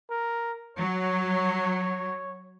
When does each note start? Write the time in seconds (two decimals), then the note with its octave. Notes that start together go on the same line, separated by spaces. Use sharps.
0.10 A#4
0.77 F#3 C#5